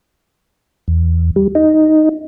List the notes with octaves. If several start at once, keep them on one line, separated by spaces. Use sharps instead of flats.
E2
G3
D#4